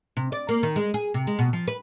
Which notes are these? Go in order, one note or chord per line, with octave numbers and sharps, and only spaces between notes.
C3
D5
A#3
D#3
G#3
G#4
C3
G#3
B2
F3
B4